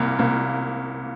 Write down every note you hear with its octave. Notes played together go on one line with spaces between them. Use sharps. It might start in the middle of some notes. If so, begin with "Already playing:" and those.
Already playing: C2 A#3
C2 A#3